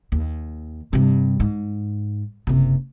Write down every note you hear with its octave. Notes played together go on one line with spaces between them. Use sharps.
D#2
G2 C3
G#2
F#1 C3